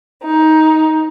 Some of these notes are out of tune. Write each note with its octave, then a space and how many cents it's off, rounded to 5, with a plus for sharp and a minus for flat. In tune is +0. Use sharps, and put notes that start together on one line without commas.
D#4 +15